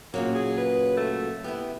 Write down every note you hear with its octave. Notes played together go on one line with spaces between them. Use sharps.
A#2 C#3 F#3 A#3
G#4
B4
A3
B3 E4 G4